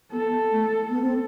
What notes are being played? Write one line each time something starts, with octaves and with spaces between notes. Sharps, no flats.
B3 A4
A3
B3 A4
C4